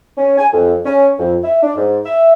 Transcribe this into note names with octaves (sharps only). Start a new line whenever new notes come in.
C#4
G#5
F2
C#4
F2
E5
D4
G#2
E5